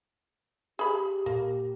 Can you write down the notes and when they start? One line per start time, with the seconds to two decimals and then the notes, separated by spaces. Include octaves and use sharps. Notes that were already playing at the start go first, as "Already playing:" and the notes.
0.79 G4 G#4 B5
1.26 A#2 A#3